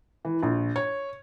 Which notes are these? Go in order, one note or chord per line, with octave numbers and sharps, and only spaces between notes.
E3
A#1
C#5